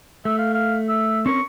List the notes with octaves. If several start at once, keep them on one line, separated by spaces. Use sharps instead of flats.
A3 E5
F5
F5
E5
C4 C#4 A#4 C#6